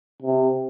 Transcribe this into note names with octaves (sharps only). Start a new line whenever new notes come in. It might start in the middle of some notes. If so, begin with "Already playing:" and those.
C3